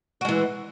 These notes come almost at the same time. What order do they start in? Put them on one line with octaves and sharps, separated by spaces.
F#4 G#3 E3